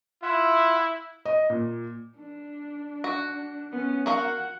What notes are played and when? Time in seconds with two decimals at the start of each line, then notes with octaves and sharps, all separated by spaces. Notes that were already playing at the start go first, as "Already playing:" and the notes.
0.23 E4 F4 E5 F#5
1.25 D#5
1.50 A#2
2.17 D4
3.04 F#4
3.72 B3 C#4
4.06 F#4 A#4 F5 F#5